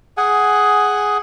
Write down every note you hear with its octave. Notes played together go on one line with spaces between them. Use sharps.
G#4 F#5 G#5